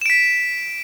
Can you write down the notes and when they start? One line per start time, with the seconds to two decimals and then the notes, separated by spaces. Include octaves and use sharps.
0.01 E7
0.06 D7
0.10 B6